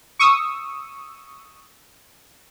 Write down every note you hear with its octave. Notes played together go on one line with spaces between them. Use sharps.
C#6 D#6 E6